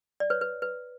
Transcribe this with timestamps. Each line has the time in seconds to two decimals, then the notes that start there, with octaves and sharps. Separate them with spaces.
0.20 D5
0.30 B4 C#5
0.41 B4
0.62 B4